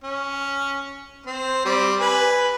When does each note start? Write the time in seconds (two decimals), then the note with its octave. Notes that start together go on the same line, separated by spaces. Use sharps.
0.04 C#4
1.26 C4 C5
1.65 G3 C4
1.99 B4 G#5